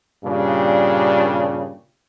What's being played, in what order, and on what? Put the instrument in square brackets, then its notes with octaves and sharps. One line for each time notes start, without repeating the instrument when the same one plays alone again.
[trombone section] G2 A#2 C#3 G3 D4